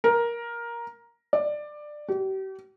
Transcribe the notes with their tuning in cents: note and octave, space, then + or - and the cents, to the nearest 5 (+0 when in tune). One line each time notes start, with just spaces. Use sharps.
A#4 +10
D5 +15
G4 -40